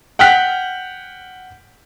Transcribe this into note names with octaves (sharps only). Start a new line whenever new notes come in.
F#5 G5 F6 F#6 B6